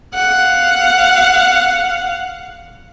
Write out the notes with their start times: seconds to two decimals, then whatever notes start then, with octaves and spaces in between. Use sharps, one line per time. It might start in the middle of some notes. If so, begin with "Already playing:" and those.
0.15 F5 F#5